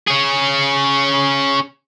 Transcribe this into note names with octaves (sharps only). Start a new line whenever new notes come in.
C#4 G#4